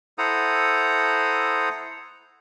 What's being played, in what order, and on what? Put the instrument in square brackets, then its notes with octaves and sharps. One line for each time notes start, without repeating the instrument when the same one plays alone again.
[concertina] E4 A4 C5 F#5 A#5 D#6